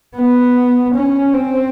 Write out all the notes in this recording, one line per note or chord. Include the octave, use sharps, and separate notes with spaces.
B3
C#4
C4